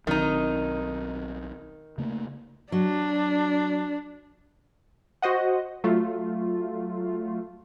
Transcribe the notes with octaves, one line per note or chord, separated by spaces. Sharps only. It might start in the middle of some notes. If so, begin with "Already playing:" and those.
B1 D#3 F#3 C4 D#4
C#3 A3 A#3
F#3 D4
F#4 C5 D#5 F#5
F#3 A3 F4